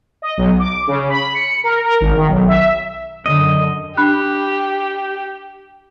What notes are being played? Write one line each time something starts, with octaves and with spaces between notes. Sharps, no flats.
D#5
B1
D6
C#3
B5
C#7
A#4
A#4
G#1
D#3
B1
E5
F#2 D3 D#5
D4 G4 B5 F#6